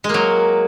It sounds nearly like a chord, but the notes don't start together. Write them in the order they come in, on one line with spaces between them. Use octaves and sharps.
G#3 A#3 F#3